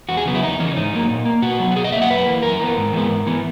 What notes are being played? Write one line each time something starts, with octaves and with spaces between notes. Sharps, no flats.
E2 F#4
G#4
C#3 F#3 B3
E4
E2 D#4
C#3 E3 C#4
G#2 D#4
F#3 A#3
A#2
A#3
B2 F#4
F#3 B3
F#4
B2 G#4
D#5
F#3 A#3 E5
F#5
F#2 B4
E3 A#3
F#2 A#4
E3 B3
G#2
E3 G#3 B3
G#2
E3 B3